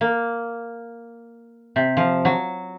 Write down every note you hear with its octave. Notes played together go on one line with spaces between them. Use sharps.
A#3
C3
F3
F#3